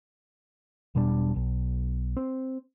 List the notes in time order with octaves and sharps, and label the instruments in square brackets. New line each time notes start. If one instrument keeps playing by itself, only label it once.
[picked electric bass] E1 B2 G3 D4
B1
C4